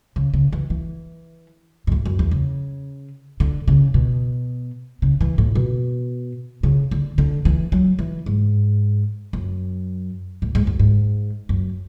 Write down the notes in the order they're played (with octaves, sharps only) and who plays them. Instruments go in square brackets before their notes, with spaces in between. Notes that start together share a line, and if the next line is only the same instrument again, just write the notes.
[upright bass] C#3
C#3
E3
E3
G#2
A2
F#2
E2
C#3
D3
C#3
B2
C#3
E3
A2
B2
C#3
D3
D3
E3
F#3
E3
G#2
F#2
A2
G#2
F#2
G#2
F#2